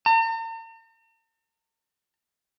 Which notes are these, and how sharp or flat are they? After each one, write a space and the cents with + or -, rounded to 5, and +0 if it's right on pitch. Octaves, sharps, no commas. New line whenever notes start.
A#5 -45